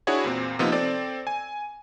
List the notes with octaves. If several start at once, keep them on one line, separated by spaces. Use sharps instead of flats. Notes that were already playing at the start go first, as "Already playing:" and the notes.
D4 E4 F#4 G#4 C#5
E2 A#2 C4
C3 F3 A#3 B3 D#4 F4
C4 A4 D5
G#5